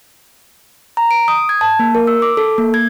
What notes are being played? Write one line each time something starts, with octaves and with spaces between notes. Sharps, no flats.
A#5
D7
D#6
G#6
A5
A#3
A#4
E6
D6
A4
A#3
G#6